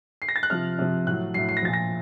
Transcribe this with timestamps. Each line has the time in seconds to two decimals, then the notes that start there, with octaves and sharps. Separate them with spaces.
0.22 C7
0.29 A#6
0.36 A6
0.43 F#6
0.50 C3 F3 F6
0.78 C3 F3
1.07 A2 F#6
1.10 F#3
1.34 A2 F#3 C7
1.49 C7
1.57 A#6
1.63 A#2 F3 A6
1.73 A#6